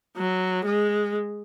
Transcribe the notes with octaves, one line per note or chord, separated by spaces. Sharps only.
F#3
G#3